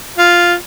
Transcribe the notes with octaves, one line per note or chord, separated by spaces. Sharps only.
F4